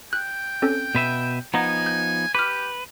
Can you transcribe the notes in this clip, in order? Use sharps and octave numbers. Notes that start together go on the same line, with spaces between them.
G5 F#6
C4 C#4 A4
B2 B4 E5
F3 B3 D#4 F#5 G#5 A#5
G6
G4 B4 D6 F6